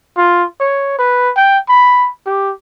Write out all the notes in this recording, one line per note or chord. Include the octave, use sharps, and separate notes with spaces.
F4
C#5
B4
G5
B5
G4